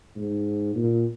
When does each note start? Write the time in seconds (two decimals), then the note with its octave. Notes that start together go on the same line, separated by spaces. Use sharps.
0.16 G#2
0.76 A#2